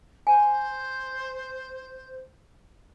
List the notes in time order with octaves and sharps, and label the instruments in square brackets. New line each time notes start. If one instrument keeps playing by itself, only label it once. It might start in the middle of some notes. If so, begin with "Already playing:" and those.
[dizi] C5 [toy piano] G#5